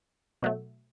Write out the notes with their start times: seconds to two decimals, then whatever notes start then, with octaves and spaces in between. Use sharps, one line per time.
0.42 B2 F#3 A3